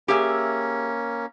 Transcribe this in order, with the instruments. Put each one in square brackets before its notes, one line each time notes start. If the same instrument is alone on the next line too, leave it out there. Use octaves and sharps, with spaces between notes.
[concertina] A#3 C#4 [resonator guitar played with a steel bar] G4 G#4 E5